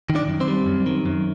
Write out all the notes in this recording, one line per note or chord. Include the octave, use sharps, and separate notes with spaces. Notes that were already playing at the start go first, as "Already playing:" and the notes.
D#3
D4 D5
F#2
C4 C5
G3
F#2
D#3
F#2